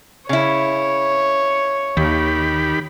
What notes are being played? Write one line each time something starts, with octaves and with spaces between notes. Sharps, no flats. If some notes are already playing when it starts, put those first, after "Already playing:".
C#3 E4 C#5
D#2 D#3 G4 B5